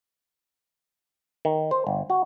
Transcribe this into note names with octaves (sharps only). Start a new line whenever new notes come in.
D#3
C5
G1
F#4